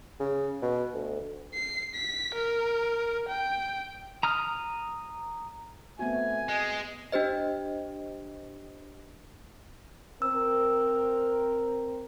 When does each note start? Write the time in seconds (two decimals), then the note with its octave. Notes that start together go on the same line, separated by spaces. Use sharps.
0.20 C#3
0.63 B2
0.94 D2
1.54 C7
1.94 B6
2.34 A#4
3.29 G5
4.23 A#5 D#6 F6
5.99 A3 B3 C4 F#4 G#5
6.49 G#3 D#5
7.12 D4 G4 C5 D#5
10.22 C4 A#4 E6